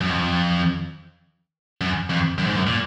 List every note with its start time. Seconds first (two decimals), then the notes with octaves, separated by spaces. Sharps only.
0.01 F#2
0.09 F2
1.81 F#2
2.10 F2
2.38 F#2
2.46 G#2
2.56 F#2
2.67 A#2